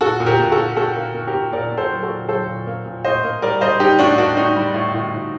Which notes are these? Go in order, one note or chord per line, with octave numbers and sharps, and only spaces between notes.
A#2 F#4 A4
A#2
G4 A#4
A#2
F#4 A4
A#3
A#2 F#4 A4
A#3
A#3
G4 A#4
A#2
A#2 A#4 D5
A#2
A4 C5
F#3
F#4 A4
A#2
F#3 A4 C5
A#2
A#3
A#2
A2 C5 D#5
A#3
G3 A#4 D5
G3 C5 D#5
G3 D#4 G4
A2 D4 F#4
A#3 D4 F#4
A2 D#4
G3
A2
A2
A2